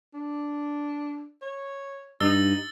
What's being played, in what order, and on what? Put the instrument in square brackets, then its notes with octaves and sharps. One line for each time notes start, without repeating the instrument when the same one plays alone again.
[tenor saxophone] D4
C#5
[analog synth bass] G2 [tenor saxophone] D#4 [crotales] E6 A6 G7